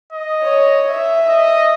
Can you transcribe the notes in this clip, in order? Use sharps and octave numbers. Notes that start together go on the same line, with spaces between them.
D#5
C#5
E5
D#5